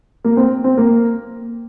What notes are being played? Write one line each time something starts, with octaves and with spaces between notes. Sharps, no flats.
A#3
C4
C4
A#3